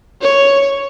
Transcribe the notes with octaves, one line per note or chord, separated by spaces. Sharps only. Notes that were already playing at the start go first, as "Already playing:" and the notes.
C#5